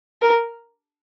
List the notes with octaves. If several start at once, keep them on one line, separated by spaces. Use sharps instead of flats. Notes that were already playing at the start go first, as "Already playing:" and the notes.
A#4